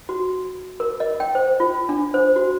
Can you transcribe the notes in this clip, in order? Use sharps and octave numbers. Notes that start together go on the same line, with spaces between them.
F#4
A#4
D#5
G5
C5
F4
D4
C5
F#4